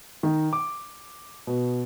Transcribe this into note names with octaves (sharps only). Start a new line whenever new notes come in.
D#3
D6
B2